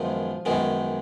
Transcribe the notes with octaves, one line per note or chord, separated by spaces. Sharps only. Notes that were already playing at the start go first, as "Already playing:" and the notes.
Already playing: F#2 D#3 F3 G#3 B3 F4
F#2 D#3 G#3 B3